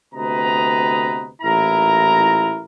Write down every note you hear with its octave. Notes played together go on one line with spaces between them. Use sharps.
D2 C3 B3 B4 D#5 A#5
A1 A#2 E4 A#4 A#5